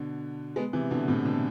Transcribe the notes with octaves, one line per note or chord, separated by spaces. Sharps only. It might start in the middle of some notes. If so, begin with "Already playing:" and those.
Already playing: B2 D3
G#3 B3
C3 E3
B2 D3
A2 C3
B2 D3